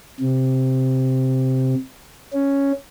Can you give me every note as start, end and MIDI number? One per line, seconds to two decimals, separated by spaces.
0.20 1.75 48
2.33 2.72 61